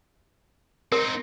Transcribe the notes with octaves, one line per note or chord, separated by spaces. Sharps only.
C4 D#4 A#4